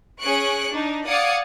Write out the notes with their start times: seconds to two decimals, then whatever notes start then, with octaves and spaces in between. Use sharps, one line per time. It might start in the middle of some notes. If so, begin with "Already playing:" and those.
0.20 C#4 G#4 C#6 F#6 C#7 D7
0.72 D4 D#4
1.07 D5 F5 F#5 D#6 G#6 C#7